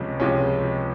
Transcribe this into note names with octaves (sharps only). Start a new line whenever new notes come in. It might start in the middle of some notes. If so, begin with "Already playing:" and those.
Already playing: C#2 C3 F3 G#3 C#4
C#2 C3 F3 G#3 C#4